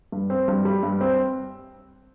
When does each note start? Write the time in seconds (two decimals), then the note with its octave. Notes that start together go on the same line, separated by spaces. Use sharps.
0.12 G2
0.30 C4
0.48 G2
0.65 G3
0.83 G2
1.01 C4